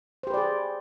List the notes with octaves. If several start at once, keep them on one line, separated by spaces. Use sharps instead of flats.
G4 G#4 B4 C5 D5